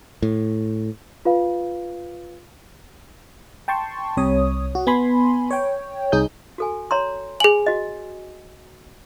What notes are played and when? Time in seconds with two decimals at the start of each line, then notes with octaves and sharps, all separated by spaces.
0.22 A2
1.25 F4 B4 F5
3.68 G5 A5 C6 C#6
4.17 C2 C3 C#5 D#6
4.75 F#4
4.87 B3 G#5 B5 C6
5.51 C#5 G5
6.12 C2 D#4 G#4 D#6 G6
6.58 F#4 A4 G#5
6.91 C#5 A#5 C6
7.40 G#4 G#5 F#7
7.66 F#4 D#5